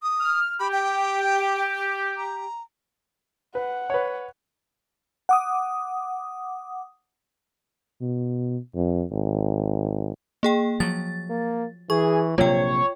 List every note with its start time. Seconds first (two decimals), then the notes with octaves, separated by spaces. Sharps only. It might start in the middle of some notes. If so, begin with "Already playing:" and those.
0.03 D#6
0.20 F6
0.60 G4 B5
0.72 G5
2.17 A#5
3.55 B4 F#5
3.90 B4 C#5
5.29 F#5 D6 D#6
8.01 B2
8.75 F2
9.11 G#1
10.43 A#3 G#4 G5
10.80 F3 F#3 A6
11.29 A#3
11.90 E3 G#4 C#6
12.38 A#1 C3 F#3 A#3 F4 C#5 G5